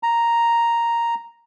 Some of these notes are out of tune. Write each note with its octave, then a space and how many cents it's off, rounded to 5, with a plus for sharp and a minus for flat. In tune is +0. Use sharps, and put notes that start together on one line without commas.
A#5 +0